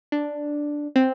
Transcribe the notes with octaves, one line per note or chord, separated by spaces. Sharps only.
D4
C4